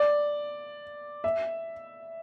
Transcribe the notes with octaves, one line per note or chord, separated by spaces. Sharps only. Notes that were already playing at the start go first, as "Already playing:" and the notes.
Already playing: D5
E5